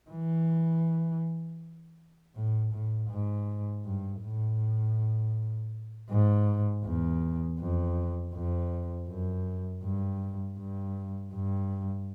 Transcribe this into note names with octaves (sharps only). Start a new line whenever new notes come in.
E3
A2
A2
G#2
G2
A2
G#2
E2
F2
F2
F#2
G2
G2
G2